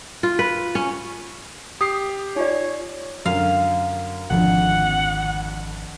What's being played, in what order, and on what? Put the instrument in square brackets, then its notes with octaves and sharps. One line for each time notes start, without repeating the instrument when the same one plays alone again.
[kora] F4
B4
C#4
[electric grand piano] G4 C7 [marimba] D#6
[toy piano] D#4 F4 D5 [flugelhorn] C#5
[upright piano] F#2 D3 [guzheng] F5
[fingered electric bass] G#1 D#3 F3 [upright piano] F2 D3 [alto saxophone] F#5